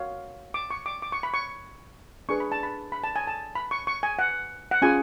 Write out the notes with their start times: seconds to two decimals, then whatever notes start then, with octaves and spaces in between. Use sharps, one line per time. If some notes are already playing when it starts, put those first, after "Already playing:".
Already playing: F#4 C#5 F5
0.54 D6
0.70 C#6
0.86 D6
1.02 D6
1.12 C#6
1.23 B5
1.34 C#6
2.29 D4 G#4 B4 C#6
2.40 B5
2.52 A5
2.63 B5
2.92 B5
3.04 A5
3.16 G#5
3.27 A5
3.55 B5
3.71 C#6
3.87 C#6
4.03 G#5
4.19 F#5
4.71 F#5
4.82 C#4 F4 G#4 G#5